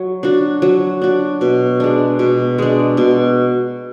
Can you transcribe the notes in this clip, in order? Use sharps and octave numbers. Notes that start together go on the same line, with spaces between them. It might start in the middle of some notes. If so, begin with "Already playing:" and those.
Already playing: F#3
D4 F#4
F#3
D4 F#4
B2
G#3 D4
B2
G#3 D4
B2